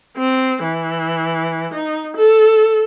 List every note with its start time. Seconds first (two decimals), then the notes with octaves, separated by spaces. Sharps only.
0.15 C4
0.61 E3
1.73 D#4
2.14 A4